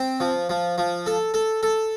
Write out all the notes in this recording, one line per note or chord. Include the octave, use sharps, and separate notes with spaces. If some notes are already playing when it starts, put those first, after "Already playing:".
Already playing: C4
F3
F3
F3
A4
A4
A4